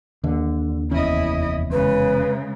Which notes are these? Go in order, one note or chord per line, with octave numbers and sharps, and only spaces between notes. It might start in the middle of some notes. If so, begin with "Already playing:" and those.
D#2 D3
F1 E2 C#4 E4 D#5
C#3 G#3 B4